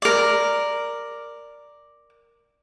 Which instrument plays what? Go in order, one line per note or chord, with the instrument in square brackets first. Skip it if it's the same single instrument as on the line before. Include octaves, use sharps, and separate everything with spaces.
[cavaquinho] A#4 D5